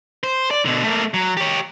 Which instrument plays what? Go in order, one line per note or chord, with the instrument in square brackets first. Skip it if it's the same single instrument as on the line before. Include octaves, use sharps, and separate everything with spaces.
[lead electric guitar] C5
D5
B2 D3
A3 A#3
F#3
G4 C#5